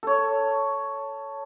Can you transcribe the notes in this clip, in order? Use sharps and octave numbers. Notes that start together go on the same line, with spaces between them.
A4 C#5